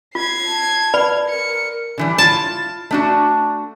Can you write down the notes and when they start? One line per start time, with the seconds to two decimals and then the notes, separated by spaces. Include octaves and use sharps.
0.15 F4 G#6 C7
0.46 A5
0.94 B4 D5 B5
1.30 A#4 C#7
1.98 D3 E3 G3
2.18 E4 F4 A5
2.91 A3 D4 F#4